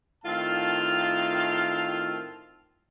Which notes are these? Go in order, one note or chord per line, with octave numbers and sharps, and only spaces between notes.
A2 D#3 C4 F4 F5 A5